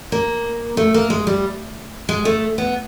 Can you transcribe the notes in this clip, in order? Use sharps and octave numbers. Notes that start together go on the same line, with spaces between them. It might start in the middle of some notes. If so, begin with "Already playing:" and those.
A#3
A3
A#3
G#3
G3
G#3
A3
B3